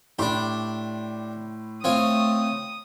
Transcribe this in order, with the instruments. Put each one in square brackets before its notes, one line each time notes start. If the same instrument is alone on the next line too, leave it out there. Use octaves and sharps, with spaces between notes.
[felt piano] A2 B5 C6 [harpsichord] D4 G4
[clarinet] A3 [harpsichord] C4 F4 C#5 [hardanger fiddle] D#6